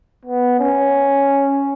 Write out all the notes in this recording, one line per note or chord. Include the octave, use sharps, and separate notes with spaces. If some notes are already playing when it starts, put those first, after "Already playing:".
B3
C#4